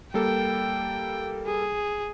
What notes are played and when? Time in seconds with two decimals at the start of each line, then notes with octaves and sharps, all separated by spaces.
0.14 G3 A#3 A4 G5
1.47 G#4